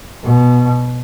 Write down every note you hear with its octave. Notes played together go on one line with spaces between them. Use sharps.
B2